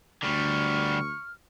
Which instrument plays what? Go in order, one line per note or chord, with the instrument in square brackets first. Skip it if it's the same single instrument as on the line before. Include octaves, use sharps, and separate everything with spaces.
[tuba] D2 [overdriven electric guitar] D3 G3 [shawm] C#6 [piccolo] F6